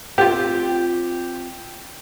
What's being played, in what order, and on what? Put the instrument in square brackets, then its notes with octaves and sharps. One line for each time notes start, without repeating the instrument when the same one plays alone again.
[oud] C4 F4 [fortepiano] G4